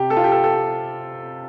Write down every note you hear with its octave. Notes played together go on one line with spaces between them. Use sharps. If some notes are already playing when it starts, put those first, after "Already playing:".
Already playing: C3 G4
A4
F4
G4
A4
A4
G4